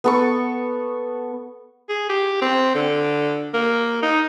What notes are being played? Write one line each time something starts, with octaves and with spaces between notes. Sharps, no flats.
B3 A4 C#6
G#4
G4
C4
D3
A#3
D#4